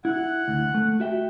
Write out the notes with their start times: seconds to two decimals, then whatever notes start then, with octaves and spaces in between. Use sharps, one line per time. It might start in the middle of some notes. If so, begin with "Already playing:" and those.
0.05 E4 F#5
0.48 D2
0.74 A3
1.00 F#4 E5 G5